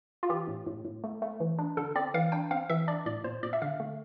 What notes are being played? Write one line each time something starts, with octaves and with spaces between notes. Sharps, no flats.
F4
E3 G4
A2
A2
A2
A3
A3
E3
D4
D3 A4
C4 D5
E3 F5
D4 G5
C4 F5
E3 E5
D4 D5
A2 D5
A#2 C5
A#2 D5
E5
D3 F5
A3